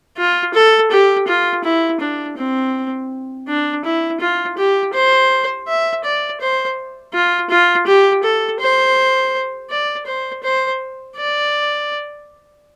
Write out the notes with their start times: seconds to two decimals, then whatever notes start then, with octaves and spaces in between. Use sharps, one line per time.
0.18 F4
0.54 A4
0.91 G4
1.27 F4
1.64 E4
2.00 D4
2.37 C4
3.48 D4
3.85 E4
4.20 F4
4.58 G4
4.94 C5
5.68 E5
6.04 D5
6.41 C5
7.13 F4
7.50 F4
7.87 G4
8.24 A4
8.60 C5
9.70 D5
10.06 C5
10.43 C5
11.17 D5